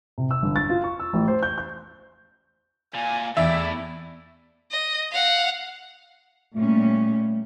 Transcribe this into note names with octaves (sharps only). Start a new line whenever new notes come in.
C3
E6
G1
A6
F4
C#6
E6
A1
C5
G6
G6
A#2 G#5
E2 A2 E4 D5 E5
D#5
F5 F#5
A#2 G3 A3 C#4